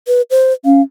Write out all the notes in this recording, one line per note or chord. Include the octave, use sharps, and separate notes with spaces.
B4
C5
C#4 F5